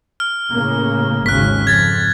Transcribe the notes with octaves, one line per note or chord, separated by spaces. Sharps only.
F6
A2 C#3 A#3
G#1 D#2 C#3 F#6 B6
F2 G#6 A6